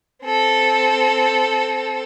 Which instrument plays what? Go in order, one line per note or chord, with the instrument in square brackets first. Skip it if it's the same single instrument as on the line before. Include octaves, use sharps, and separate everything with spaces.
[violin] C4 A4